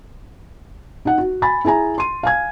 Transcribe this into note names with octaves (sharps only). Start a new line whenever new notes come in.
D#4 F#5
F#4
G#5 B5 A6
E4 G#4 G#5 A#5
C6 D#7
F5 G#5 G#6